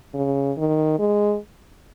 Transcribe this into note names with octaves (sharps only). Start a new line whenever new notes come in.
C#3
D#3
G#3